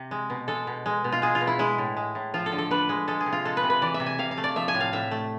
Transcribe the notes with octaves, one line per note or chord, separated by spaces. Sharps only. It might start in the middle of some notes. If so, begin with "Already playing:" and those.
Already playing: C3
G#3
B2
G#3 A4
B2
G#3
B2
F4
G#3 G#4
F4
B2
E4
G#3 E4
A2
G#3
A2
F3 F4
A4
D3
A4
D3 B4
G#3
G#3 A4
G#4
C3
F4
G#3 A4
B4
C3
B4
E3 D5
E5
C3
G#5
C3 F5
F5
A3
D5
F3 E5
G#5
A2
F5
A2 E5
A3